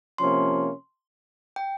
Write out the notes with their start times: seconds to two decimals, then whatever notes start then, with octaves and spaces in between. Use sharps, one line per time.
0.18 C3 F3 A#3 C#4 C6
1.56 G5